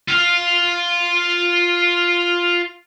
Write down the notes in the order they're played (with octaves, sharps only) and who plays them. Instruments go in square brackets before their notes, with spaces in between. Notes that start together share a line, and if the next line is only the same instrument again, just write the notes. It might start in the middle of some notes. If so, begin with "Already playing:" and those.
[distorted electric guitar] F4 F5